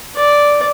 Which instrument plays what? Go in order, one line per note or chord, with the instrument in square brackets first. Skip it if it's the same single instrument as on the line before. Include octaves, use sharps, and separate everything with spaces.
[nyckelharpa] D5